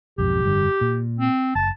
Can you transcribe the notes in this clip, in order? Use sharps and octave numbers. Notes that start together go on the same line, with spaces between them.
B1 F2 G#2 G4
F1 G2 D3
A#2
C4
F#1 A5